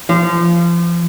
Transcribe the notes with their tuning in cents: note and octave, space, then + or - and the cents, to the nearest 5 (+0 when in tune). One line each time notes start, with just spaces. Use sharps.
F3 -30